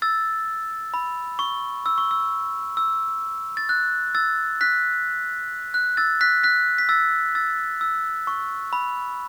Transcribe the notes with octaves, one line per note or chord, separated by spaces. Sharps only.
E6 A6
B5
C#6
E6
C#6
E6
E6
A6
F#6
E6 A6
F#6 B6
F#6
E6 A6
F#6 B6
F#6 B6
B6
E6 A6
E6 A6
E6
C#6
B5